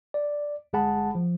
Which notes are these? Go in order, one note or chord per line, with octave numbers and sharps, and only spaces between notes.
D5
G1 G#3 G#4 F#5 A5 B5
F3